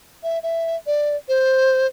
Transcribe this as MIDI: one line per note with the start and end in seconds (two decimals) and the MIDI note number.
0.23 0.39 76
0.43 0.76 76
0.87 1.16 74
1.28 1.87 72